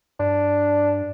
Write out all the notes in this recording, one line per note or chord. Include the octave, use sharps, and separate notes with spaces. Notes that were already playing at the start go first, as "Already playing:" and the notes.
G2 D4